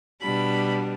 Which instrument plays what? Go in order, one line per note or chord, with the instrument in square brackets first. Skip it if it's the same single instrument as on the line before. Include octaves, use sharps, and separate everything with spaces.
[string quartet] B2 G3 D4 B5